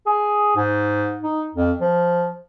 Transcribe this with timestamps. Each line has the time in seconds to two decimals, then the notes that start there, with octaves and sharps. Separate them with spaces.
0.06 G#4
0.56 G#2
1.23 D#4
1.55 F2
1.81 F3